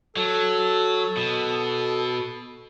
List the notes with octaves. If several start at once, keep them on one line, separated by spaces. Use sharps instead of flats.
F#3 A4
B2